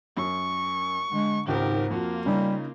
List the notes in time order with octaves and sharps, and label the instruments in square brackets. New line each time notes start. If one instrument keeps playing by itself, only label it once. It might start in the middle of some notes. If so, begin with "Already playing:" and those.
[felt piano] F#2 [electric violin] C#6
[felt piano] D3 [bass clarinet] G#3
[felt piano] G#1 C#2 D#3 [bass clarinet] G#2 [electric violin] G4 A#4
[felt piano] F2 F#4 [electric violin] A#3 F4
[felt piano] C#3 D#4 [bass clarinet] G3